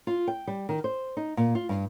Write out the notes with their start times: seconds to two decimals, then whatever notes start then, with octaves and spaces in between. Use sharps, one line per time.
0.07 F4
0.27 G5
0.47 G3
0.69 D#3
0.84 C5
1.17 D#4
1.37 A#2
1.55 F4
1.69 G2